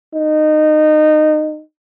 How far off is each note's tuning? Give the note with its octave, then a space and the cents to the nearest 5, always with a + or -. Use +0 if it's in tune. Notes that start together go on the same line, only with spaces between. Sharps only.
D#4 -20